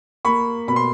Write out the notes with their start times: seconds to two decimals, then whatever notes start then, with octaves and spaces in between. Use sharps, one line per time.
0.25 A#3 B5 C#6
0.68 B2 B5
0.76 C6